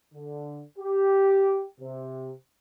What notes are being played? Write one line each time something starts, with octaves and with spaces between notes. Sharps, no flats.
D3
G4
C3